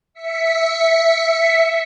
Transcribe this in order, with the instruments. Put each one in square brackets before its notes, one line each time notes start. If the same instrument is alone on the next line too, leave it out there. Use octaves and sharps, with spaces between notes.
[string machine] E5 B6 C#7